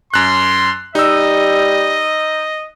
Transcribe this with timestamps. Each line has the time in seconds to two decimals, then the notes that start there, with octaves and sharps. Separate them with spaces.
0.14 F#2 C6 F#6
0.95 G3 D#4 D#5 E6